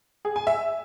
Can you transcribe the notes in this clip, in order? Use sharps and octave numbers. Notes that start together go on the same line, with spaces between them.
G#4
G#5
E5